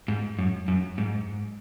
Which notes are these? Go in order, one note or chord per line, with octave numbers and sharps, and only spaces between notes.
G#2
F#2
F#2
G#2